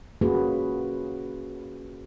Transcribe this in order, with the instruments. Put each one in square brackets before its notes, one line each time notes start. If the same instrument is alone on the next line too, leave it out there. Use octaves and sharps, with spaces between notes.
[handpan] A#3 C#4 F4 F#4 G#4 B4